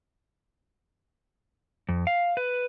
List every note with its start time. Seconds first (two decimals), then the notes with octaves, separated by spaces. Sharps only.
1.89 F2
2.07 F5
2.37 B4